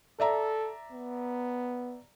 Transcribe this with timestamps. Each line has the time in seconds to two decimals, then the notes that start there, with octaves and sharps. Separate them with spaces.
0.20 A4 D5 E5 A#5
0.92 B3